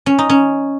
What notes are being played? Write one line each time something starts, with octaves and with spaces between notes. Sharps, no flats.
C#4
D#4
C#4